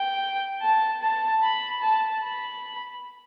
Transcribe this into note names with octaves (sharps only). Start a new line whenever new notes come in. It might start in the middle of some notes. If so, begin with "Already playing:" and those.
Already playing: G5
A5
A5
B5
A5
B5